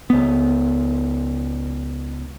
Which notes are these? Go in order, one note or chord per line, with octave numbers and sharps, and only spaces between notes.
C#2 B3